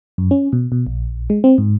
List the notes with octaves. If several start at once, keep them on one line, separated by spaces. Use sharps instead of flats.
F#2
C#4
B2
B2
A#1
G#3
C4
G#2